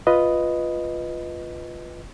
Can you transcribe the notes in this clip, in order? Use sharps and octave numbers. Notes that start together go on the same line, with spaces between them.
F4 B4 D#5